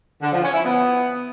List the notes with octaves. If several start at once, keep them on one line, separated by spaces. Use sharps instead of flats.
D3
F3
C#4
E4
B3